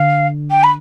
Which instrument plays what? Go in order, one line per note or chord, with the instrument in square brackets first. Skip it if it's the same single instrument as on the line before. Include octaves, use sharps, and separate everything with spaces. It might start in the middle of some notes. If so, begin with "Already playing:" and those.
Already playing: [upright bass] D3 [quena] F5
[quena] G5
B5